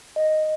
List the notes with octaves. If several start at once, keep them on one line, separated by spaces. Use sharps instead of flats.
D#5